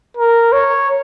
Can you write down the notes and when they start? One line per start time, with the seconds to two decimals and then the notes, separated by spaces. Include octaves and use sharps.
0.17 A#4
0.52 C#5